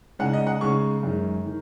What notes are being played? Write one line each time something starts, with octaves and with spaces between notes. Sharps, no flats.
C#3 G#3 D#4 F#5
D#5
F#5
C#3 G#3 D#4 C#6
F#2 D#3 G#3
D#3